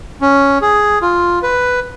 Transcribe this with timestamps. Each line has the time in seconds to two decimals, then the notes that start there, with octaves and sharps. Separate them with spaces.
0.21 C#4
0.62 G#4
1.02 F4
1.43 B4